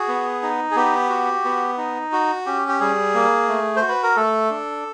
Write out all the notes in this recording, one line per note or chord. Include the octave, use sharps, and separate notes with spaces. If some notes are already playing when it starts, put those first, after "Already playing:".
Already playing: F#4 G#4
B3
D#4
G#4
B3 G4
F#4
B3
D#4
F#4
C#4 G4
G4
G3 G#4
A#3
A3
C5
F#4
B4
A#4
A3 A4
D4